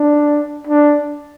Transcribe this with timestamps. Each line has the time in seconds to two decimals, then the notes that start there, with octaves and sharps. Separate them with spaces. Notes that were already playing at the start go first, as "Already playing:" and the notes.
Already playing: D4
0.67 D4